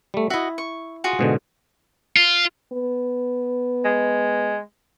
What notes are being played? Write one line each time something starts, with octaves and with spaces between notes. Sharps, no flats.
G3 A3
E4 F#4 D#5 E5
C#6
F4 F#4 G#4
G#2 B2 D3
F4
B3
G#3